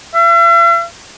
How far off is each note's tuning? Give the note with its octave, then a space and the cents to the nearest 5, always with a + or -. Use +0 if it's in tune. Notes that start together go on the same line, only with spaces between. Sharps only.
E5 +45